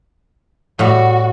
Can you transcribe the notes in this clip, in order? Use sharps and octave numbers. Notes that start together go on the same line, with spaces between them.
A2 G3 F#4